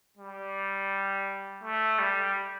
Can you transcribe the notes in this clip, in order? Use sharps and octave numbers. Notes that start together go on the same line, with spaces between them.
G3
A3
G3